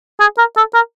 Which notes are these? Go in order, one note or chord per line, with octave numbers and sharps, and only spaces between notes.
G#4
A#4
A4
A#4